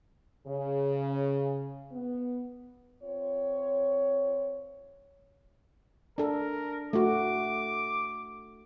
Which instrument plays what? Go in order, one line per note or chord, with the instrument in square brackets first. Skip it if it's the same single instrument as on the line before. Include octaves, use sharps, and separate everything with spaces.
[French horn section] C#3
B3
C4 F4 C#5
[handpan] D4 A4 [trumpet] A#4
[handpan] A3 F#4 [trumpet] D6